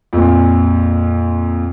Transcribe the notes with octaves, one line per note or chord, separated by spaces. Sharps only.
F2 A#2